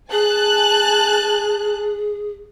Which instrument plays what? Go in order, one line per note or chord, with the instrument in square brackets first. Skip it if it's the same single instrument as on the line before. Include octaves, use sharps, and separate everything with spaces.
[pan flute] G#4 [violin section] G#5 A5 F#6